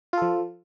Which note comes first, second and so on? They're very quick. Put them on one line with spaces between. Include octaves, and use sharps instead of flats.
F4 A4 F3